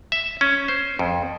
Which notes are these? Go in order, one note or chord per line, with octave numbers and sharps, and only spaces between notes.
E5
C#4
C5
F2